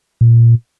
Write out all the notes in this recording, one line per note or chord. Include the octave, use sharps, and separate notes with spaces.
A#2